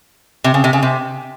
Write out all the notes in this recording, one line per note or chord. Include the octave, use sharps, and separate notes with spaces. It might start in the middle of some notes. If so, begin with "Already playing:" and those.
C3
C#3
C3
C#3
C3